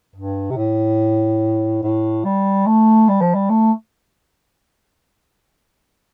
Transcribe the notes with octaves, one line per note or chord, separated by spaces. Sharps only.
G2
C3
A2
A2
G3
A3
G3
F3
G3
A3